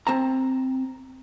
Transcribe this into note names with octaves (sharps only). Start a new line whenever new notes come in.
C4 A5 A#5